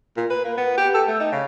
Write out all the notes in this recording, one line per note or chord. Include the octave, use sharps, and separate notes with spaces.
A#2
B4
A#3
B3
G4
A4
A3
D#4
C#3